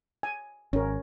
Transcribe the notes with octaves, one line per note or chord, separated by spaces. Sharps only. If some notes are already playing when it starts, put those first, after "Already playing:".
G#5
G#1 C#4 A#4